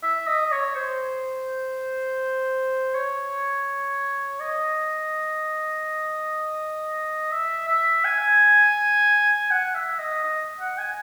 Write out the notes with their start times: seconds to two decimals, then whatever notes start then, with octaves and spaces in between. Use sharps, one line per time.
0.03 E5
0.27 D#5
0.46 D#5
0.52 C#5
0.75 C5
2.94 C#5
4.40 D#5
7.32 E5
7.68 E5
8.05 G#5
9.51 F#5
9.75 E5
9.99 D#5
10.24 D#5
10.60 F#5
10.78 G#5